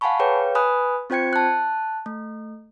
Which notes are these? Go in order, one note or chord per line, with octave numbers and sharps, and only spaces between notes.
F5 F#5 G#5 A5 B5 C#6
G#4 B4 C#5 F5 G5
B4 G#5 B5 D#6 F#6
C4 F4 C5 G5 G#6 C#7
A5 F#6
A3